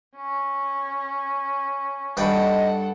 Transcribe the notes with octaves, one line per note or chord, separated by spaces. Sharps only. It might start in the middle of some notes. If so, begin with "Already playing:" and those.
C#4
G2 A4 B4 D#5 F#5 G5